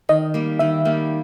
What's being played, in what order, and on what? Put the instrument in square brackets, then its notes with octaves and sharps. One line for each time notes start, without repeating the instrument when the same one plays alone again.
[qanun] D#3 [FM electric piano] D#5
[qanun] G3 A#3
[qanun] D#3 [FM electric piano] E5
[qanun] G3 A#3